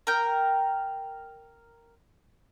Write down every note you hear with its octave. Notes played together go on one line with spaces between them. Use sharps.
A#4 G5